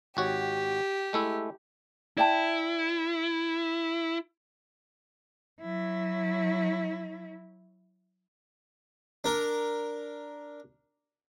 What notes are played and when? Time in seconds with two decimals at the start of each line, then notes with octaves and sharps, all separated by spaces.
0.17 G#1 F#4 G4 C#5
1.13 G#3 A3 E4
2.17 E4 D5 G5 A5
5.61 F#3 E4
9.24 D4 A#4